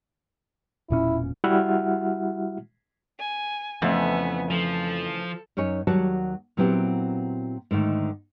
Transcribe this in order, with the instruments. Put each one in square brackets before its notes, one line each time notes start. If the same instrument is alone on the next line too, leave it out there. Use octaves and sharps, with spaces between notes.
[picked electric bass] E1 A#2 C#4 [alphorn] E4
[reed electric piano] G3 E4 F#4 E5 F#5 F6
[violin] G#5
[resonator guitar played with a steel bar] F2 [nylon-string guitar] C#3 E3 A3 [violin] B3 G#5
[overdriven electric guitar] F3 [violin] A4
[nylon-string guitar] F#2 C#4 D#4 C#5 G#5
D#2 F#3 G3 F#4 C#5 A5
A#2 F#3 B3 C4 E4 G4
G#2 D3 D#3 A3